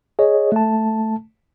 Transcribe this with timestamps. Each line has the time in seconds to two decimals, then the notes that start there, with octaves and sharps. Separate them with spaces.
0.19 G#4 C#5 D#5
0.52 A3 A5